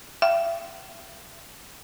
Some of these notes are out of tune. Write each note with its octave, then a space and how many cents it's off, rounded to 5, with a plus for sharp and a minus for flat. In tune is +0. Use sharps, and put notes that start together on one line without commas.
E5 +35 G5 -40